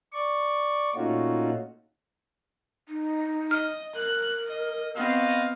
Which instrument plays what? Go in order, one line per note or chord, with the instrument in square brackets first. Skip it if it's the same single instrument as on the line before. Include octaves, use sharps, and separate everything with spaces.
[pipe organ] D5 C#6
A#2 A3 C#4 D#4 F4 F#4
[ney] D#4
[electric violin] D#5 [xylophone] F6
[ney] A#4 [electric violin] F#6
[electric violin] D#5
[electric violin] B3 C4 [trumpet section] F#4 D#5 F5